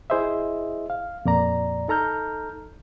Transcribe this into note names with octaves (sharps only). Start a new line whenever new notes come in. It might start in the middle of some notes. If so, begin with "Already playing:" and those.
E4 G#4 C5 D#5 E5
F5
F2 A#2 D5 A#5
D#4 A4 A#5 F6 G6